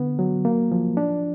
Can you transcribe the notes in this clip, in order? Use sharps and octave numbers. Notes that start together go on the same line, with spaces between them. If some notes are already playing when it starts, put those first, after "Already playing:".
Already playing: D3 B3
F#3
A#3
F3
D4